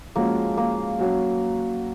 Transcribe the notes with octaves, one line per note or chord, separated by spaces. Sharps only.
F3 G#3 A#3 C#4 F#4
A#3
F#3 C#4 F#4